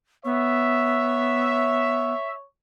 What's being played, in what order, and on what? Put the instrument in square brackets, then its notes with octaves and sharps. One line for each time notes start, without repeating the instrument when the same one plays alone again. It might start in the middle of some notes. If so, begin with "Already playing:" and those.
[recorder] B3 [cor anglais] C#5 [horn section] E5